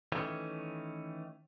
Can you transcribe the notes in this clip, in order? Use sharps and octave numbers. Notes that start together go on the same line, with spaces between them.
D#3 E3 A3 C#4